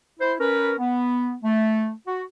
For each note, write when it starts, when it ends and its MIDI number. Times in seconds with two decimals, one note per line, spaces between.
0.19 0.33 64
0.19 0.33 72
0.40 0.73 61
0.40 0.73 70
0.40 0.73 71
0.79 1.33 59
1.43 1.91 57
2.07 2.22 66